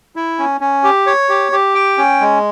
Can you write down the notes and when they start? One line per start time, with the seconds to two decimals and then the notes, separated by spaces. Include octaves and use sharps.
0.16 E4
0.39 C#4
0.61 C#4
0.84 G4
1.07 C#5
1.29 G4
1.52 G4
1.75 G5
1.98 C#4
2.21 G#3